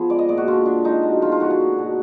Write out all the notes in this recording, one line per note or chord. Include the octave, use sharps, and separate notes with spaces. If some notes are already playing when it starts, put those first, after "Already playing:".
Already playing: F3 B3 G#4
G#3 D5
D#5
A#2 D5
F#4
D3 F4
D4
G#3 D#4
B2
F3 F4
F4
D3 F#4
G#4
A#3
B2